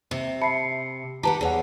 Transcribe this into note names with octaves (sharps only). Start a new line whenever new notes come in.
C3
E5 A5 B5 C7 C#7
G4 B4 F#5 A5 A#5
E2 G#4 C#5 F#5